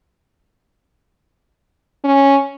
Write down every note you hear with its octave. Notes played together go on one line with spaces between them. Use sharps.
C#4